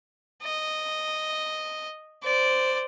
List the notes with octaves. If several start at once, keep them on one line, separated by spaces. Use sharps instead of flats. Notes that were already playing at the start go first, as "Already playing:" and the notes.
D#5
C5 D5